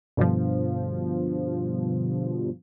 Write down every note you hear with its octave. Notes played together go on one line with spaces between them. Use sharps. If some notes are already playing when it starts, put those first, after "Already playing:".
G2 B2 D3 F3